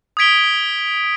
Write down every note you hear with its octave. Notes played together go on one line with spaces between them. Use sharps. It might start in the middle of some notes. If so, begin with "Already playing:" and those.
D#6 G#6 B6 D7 G7